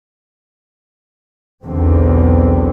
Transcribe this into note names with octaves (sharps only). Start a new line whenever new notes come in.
B1 E2 D3 C4